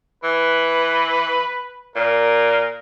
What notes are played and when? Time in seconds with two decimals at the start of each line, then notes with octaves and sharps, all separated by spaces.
0.24 E3 B4
1.96 A#2 A#4